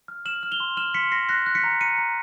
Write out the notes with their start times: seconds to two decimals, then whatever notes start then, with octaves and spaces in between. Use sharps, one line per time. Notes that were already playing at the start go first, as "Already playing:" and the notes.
0.08 F6
0.25 F6 E7 F#7
0.43 F6
0.51 F7 G7
0.60 C6
0.77 F6 E7 F#7
0.94 C6 B6 C#7
1.12 C6 A#6 C7
1.29 F#6 A#6 C7
1.46 F#6
1.55 B6 C#7
1.64 A#5
1.81 A#5 C#7 D#7
1.98 A#5